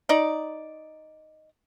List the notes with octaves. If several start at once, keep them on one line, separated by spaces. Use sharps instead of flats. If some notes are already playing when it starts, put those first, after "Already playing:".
D#4 D5